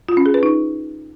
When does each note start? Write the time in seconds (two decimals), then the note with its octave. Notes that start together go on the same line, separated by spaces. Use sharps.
0.09 F4
0.17 C#4
0.26 G#4
0.34 B4
0.43 D#4